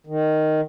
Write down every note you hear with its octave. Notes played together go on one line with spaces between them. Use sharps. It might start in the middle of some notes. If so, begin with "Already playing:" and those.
D#3